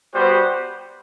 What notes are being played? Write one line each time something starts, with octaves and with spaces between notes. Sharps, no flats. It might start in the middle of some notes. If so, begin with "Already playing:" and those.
G3 B3 F#4 C5